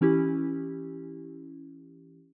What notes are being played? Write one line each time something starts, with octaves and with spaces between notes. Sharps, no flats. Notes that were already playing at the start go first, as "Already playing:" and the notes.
E3 C#4 E4 G4